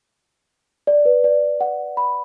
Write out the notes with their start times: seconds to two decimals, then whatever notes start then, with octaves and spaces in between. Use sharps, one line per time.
0.87 D5
1.05 B4
1.24 D5
1.61 F#5
1.97 B5